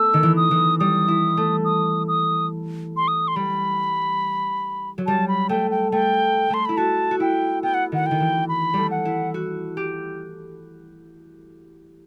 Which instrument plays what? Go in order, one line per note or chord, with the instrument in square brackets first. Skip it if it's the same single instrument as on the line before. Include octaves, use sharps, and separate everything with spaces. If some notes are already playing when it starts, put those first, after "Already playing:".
Already playing: [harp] A3 B3 [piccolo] E6
[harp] D#3
E3
[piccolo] D#6
[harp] E3
[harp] G3 [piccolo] D#6
[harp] E4
A3
[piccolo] D#6
D#6
C6
D#6
C6
[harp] G3 [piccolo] B5
[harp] F#3
[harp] G3 [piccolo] A5
[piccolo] B5
[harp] A3 [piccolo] G5
[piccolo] G5
[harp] A3 [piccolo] G5
[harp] A3 [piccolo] C6
[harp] E4 [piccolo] B5
[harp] F#4 [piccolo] A5
[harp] F#4
[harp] E4 [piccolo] G5
[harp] B3 [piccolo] G5
[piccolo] F#5
[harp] D#3 [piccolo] F#5
[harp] D#3 [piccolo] G5
[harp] E3
[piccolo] B5
[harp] G3 A3
[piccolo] F#5
[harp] E4
F#4
G4